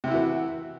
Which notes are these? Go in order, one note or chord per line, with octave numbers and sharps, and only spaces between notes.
C3 E3 E4 F#4